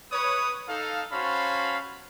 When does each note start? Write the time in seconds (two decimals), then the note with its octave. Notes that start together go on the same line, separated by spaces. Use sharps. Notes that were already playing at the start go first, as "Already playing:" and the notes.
0.12 B4 C#5 D#6
0.68 D#4 A4 F5
1.11 C#4 F#4 C5 F5 A5 B5